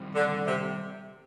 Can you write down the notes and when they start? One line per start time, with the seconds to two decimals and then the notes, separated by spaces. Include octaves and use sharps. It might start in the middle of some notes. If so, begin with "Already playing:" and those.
Already playing: D#3 G3 C4 G4
0.15 D3
0.47 C3